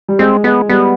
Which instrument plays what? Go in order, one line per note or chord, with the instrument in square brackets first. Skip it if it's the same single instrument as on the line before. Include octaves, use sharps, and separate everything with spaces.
[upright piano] G3
[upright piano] G#3 [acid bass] C4
[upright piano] G#3 [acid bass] B3
[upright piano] G3 [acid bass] B3